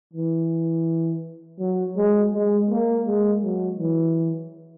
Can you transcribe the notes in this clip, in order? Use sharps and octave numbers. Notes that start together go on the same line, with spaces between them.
E3
F#3
G#3
G#3
A#3
G#3
F#3
E3